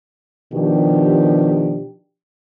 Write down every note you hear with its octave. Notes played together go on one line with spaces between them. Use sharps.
B2 D#3 F3 D4 G4